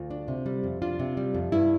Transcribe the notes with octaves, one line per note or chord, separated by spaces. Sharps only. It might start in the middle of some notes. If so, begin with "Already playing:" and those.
Already playing: D2 F4
D4
C3
G3
F2
D4 F4
C3
G3
F2
G2 E4